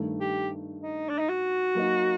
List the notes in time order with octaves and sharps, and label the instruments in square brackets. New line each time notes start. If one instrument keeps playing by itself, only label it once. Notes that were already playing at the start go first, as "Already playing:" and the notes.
Already playing: [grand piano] G2 D#3 A3
[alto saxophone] G4
D#4
D4
D#4
F#4
[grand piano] F#3 A#3 D#4